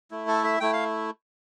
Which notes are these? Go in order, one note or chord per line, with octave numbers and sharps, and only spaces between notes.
A3 E4
A4
E5
A3 E4 G5
F5